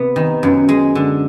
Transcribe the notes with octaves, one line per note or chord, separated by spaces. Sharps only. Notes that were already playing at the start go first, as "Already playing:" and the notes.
Already playing: C3 B3
D#3
F#2
G#3
D3